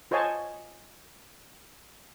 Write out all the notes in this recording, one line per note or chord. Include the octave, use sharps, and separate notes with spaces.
F4 C5 C#5 D#5 G#5 A5